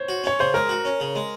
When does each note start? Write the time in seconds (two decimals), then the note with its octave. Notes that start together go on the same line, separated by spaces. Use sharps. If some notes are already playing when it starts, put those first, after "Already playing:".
Already playing: C5 C#5
0.09 F#4
0.24 C#4 C#5
0.39 C#3 C5
0.54 G#3 A#4
0.69 F#4
0.85 C#4
1.00 C#3
1.15 G#3